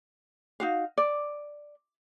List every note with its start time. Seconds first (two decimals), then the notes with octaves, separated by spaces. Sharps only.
0.60 D#4 F#4 F5
0.98 D5